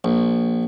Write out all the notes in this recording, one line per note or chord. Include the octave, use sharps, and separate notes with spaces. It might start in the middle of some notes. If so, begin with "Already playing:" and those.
A#1